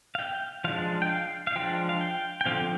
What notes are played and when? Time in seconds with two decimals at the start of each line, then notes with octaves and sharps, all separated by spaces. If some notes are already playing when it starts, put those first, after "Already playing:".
0.15 F5
0.19 G5
0.64 F3 G#3 D4 F5
1.02 G5
1.09 F5
1.47 F5
1.56 F3 G#3 D4 G5
1.89 F5
2.01 G5
2.41 G5
2.46 D3 F3 C4 F5